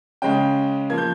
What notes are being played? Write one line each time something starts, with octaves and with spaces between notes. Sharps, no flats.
C#3 G#3 C#4 G5
F3 A#3 G#6
G6